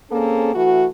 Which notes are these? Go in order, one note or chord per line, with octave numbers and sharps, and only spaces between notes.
A#3 C4 C#4 G#4 A4
E3 A3 F#4